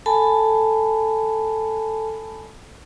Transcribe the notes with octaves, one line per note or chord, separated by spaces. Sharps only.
A4 G#5 A5 B5